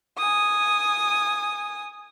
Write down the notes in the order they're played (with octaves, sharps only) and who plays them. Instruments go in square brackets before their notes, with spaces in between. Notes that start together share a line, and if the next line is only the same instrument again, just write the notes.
[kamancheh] G#5 D#6